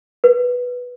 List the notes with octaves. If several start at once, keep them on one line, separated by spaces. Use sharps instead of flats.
B4